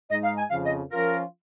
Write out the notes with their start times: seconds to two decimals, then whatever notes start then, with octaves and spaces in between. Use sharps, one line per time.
0.10 G#2 G#3 D#4 D#5
0.24 F5
0.37 G#5
0.51 F2 C#3 F3 F5
0.65 D#5
0.91 F3 C#4 F4 A#4